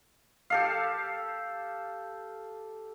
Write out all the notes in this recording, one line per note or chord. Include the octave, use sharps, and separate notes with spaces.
G4 A4 F5